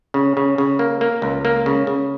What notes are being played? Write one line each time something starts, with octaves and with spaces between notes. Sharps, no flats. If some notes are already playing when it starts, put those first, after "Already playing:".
C#3
C#3
C#3
A#3
A#3
C#2
A#3
C#3
C#3